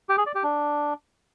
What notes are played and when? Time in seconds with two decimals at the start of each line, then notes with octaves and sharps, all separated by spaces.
0.09 G4
0.18 G#4
0.26 D5
0.35 G4
0.43 D4